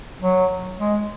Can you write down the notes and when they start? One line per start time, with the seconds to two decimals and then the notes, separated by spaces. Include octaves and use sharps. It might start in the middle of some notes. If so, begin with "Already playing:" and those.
0.21 F#3
0.79 G#3